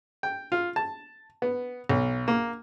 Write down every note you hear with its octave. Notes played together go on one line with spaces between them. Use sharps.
G5
F4
A5
B3
B1
A#3